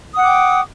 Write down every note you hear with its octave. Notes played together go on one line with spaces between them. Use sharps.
F#5 G5 D6 D#6